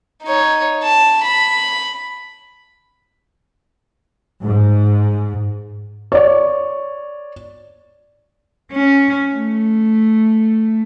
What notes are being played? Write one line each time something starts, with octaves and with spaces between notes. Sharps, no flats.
D#4 C#5
A5
B5
G#2
C#5 D5
C#4
A3